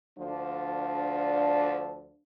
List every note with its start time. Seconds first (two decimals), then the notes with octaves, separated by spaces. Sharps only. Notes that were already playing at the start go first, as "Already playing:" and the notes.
0.19 D2 F3 D4